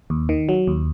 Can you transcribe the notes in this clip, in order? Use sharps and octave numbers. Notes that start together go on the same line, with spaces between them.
D#2
D#3
F#3
D#2